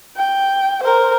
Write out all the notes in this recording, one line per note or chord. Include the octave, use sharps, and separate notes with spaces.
G5
A#4 C5